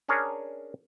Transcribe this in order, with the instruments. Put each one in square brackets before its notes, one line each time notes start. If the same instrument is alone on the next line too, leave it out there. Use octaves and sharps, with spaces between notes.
[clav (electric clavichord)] C#4 D4 G#4 A#4 C#5